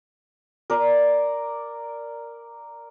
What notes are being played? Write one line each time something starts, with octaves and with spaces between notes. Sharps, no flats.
A#4 D5